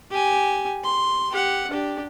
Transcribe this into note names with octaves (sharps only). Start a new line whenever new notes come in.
G4 G#5
C6
G4 F#5
D4 G4